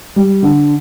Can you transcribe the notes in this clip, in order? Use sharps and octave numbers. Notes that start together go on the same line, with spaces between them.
G3
D3